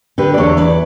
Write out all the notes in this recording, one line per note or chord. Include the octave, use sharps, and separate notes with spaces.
D3 G4 B4
D5
E2 A4 C#5
E3 B4 D5